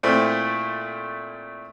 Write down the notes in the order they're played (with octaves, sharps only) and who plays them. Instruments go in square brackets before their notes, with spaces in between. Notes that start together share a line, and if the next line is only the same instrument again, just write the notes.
[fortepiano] A#2 A3 C4 E4